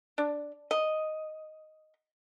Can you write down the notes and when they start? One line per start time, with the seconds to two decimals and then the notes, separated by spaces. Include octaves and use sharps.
0.18 D4
0.71 D#5